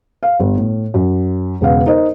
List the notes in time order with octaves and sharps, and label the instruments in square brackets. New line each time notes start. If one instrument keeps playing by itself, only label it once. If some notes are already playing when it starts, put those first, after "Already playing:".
[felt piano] F5
G1
A2
F#2
E1 C#3 B3 F5
D#4 A#4 C5 D#5